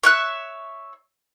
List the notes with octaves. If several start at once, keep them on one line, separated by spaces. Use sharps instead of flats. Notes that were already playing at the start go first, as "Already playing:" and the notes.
C#5 E5 F#6